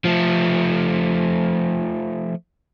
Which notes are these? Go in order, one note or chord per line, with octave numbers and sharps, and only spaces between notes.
F3 A3